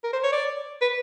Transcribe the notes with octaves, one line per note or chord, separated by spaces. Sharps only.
A#4
C5
C#5
D5
B4